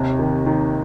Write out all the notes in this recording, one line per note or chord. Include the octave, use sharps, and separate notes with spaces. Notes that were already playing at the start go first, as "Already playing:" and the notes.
Already playing: D#2 C3
D#3
D#3